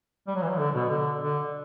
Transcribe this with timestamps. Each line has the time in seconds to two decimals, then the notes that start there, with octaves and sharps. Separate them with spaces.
0.27 G3
0.35 F#3
0.43 E3
0.50 F#3
0.59 D3
0.74 B2
0.89 D3
1.20 D3